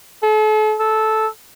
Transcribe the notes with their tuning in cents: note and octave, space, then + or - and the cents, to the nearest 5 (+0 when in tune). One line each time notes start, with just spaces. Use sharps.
A4 -40
A4 -10